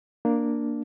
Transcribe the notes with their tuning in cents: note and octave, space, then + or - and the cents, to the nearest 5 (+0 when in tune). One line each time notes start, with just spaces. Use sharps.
A#3 +0 D4 +0